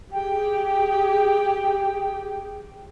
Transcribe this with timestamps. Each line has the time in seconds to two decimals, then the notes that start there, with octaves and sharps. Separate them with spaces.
0.12 G4 G#4 G5